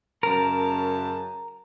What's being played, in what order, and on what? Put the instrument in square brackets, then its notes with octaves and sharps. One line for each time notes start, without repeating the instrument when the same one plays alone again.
[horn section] F#2 C#3 A5 [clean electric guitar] A#4